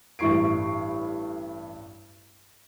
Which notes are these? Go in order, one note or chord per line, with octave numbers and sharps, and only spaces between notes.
A1 G2 E4 C#6 C7 D7